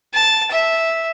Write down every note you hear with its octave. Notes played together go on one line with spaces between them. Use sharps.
A5
E5